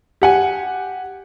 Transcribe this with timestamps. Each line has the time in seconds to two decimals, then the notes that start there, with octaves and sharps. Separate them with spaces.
0.22 G4 F#5 G#5